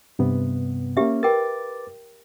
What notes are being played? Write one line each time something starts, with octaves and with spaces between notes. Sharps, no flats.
G2 C3 B3
A#3 C#4 G4 E5
A#4 B4 G5 D6 A6